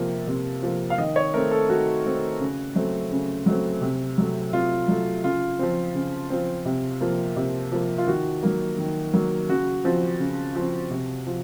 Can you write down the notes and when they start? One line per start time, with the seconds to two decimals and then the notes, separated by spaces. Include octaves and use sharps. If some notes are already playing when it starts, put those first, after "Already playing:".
Already playing: C3 F3 A#3
0.27 C3
0.63 F3 A#3
0.90 F5
0.98 D#3 D#5
1.16 C#5
1.34 A3 C4 A#4
1.51 A4
1.69 D#3 F#4
2.05 A3 C4
2.40 C#3
2.75 F#3 A3 C4
3.11 C#3
3.46 F#3 A3 C4
3.81 C3
4.18 F#3 A3
4.53 C3 F4
4.88 F#3 A3
5.24 C#3 F4
5.59 F3 C4
5.94 C#3
6.30 F3 C4
6.65 C3
7.01 F3 A#3
7.36 C3
7.72 F3 A#3
7.98 F4
8.07 D#3 F#4
8.43 F#3 A#3
8.78 D#3
9.13 F#3 A#3
9.49 C#3 F#4
9.85 F3 C4
10.20 C#3
10.56 F3 C4
10.91 C3
11.27 F3